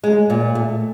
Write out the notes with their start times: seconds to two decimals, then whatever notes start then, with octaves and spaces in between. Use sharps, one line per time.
0.03 G#3
0.30 A#2
0.55 A3